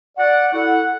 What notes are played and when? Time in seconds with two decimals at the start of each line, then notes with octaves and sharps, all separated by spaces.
0.18 D5 F#5
0.53 E4 A4 F#5